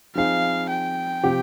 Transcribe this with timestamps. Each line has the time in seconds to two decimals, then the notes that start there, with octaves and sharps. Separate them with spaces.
0.15 F3 C4 D#4 G#4 F5
0.70 G5
1.24 C3 F3 C4 G4